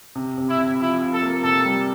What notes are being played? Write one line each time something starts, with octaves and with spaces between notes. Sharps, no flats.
C3
C3
E4
C3
F3 E4
F4
A4
A#3
C3 A4
G3